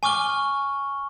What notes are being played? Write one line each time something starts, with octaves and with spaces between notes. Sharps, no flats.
G#5 C#6 D6 F6 G7